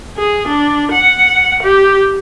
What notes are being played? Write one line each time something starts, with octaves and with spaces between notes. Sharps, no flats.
G#4
D4
F#5
G4